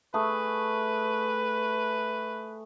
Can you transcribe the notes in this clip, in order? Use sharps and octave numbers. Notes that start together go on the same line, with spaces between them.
A3 G#4 B4